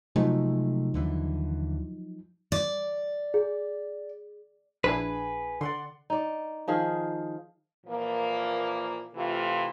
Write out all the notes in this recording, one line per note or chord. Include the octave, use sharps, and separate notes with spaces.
C3 F3 F#3 G#3 A3 D#4
D#2 D3 E3
D5
G#4
A#1 D4 E4 G#4 B4 G#5
D3 D5 F#5 C6
D#4 D5
D#3 F3 G#4
A#2 E3 F3 A#3
C3 E3 A3 E4 F4